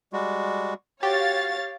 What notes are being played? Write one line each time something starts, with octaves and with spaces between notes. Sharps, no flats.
G3 G#3 F#4
F#4 G4 C#5 F5 A6